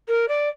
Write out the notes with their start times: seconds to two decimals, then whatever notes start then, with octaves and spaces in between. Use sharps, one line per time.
0.08 A#4
0.28 D5